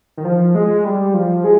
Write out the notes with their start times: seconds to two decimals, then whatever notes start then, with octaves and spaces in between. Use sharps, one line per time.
0.17 D#3
0.25 F3
0.55 G#3
0.84 G3
1.14 F3
1.44 G#3